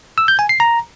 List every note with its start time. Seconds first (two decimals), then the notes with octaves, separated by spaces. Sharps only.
0.18 E6
0.28 G6
0.39 G#5
0.49 C7
0.60 A#5